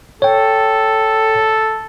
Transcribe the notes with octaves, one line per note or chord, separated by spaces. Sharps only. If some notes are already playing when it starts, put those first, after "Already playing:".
A4 C#5 G5